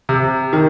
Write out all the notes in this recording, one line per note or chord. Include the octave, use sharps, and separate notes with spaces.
C3
D#3